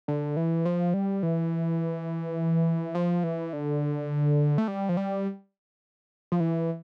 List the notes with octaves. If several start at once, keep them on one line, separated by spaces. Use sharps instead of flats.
D3
E3
F3
G3
E3
F3
E3
D3
A3
G3
F3
G3
F3
E3